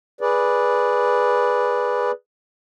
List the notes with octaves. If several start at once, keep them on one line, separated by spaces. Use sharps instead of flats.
G#4 B4 D5